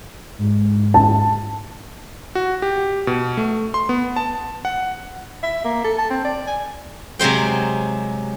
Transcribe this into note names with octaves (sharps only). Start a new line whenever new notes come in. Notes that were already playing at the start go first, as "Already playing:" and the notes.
G#2
A5
F#4
G4
B2
A3
C6
B3
A5
F#5
E5
A#3
A4
A5
C4
D5
G#5
C3 F#3 G#3 C5 G5